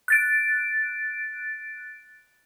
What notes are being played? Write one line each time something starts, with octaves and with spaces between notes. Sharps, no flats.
F#6 A6 D7